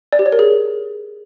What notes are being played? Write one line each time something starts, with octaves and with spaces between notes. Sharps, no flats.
D5
G4
C#5
A#4
G#4